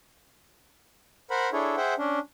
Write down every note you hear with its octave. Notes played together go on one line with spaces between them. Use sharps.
A#4 C5 F#5 B5
D4 E4 G#4 A4 C#5
G#4 C5 E5 F#5 G5
C#4 D4